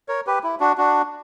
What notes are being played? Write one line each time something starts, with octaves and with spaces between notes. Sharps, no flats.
A#4 C#5
G4 B4
E4
D4 F#4
D4 F#4